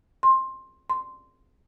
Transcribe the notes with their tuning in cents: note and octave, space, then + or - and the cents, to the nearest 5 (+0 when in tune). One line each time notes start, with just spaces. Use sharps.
C6 +15
C6 -5